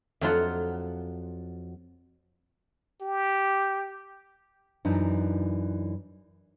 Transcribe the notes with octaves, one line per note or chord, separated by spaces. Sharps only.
F2 F#3 F4 F#5
G4
F#2 E3 D4 D#4